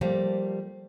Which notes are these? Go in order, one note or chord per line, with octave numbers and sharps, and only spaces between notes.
F3 G3 A3 A#3